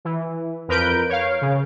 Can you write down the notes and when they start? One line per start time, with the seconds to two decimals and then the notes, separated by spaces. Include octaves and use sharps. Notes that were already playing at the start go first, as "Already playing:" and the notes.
0.05 E3
0.68 F2 A#4 B4 G6 D7
1.09 C#5 F5
1.42 C#3